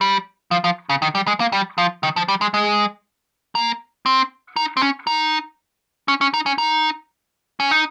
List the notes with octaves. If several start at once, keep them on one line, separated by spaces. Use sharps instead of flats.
G3
F3
F3
C#3
D#3
G3
G#3
A#3
G3
F3
D#3
F3
G3
G#3
G#3
A#3
C4
D#4
C4
C#4
D#4
C#4
C#4
D#4
C#4
D#4
C#4
D#4